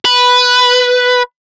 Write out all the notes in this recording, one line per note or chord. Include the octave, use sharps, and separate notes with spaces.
B4